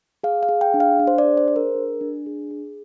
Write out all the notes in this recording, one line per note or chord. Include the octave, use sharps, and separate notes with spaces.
G#4 F5
F5
G#4
G5
D4
F5
D4
C5
D5
G#4
C5
G#4 C5
A#4
D4
D4
G#4
G#4